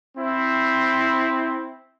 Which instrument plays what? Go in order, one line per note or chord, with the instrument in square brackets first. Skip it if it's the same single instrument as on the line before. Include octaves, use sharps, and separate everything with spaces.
[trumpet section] C4 E4